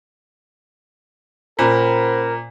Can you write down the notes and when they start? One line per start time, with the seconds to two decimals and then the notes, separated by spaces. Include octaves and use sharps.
1.59 A#2 C#4 A#4 C5 B5